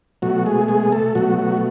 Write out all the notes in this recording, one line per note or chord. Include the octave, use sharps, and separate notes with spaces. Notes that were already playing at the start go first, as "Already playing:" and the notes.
B2 F#3 A3 F#4
G#3 G#4
G#3 G#4
A3 A4
B2 F#3 A3 F#4
F#3 F#4